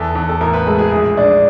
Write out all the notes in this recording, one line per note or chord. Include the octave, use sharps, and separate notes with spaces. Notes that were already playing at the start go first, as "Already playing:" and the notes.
Already playing: E2 A4
E2
A4
A1 A#4
B4
G#3 A4
G#4
A#1 G#4
A#1 D4